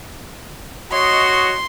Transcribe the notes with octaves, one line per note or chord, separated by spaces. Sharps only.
F#4 C#5 D#5 C6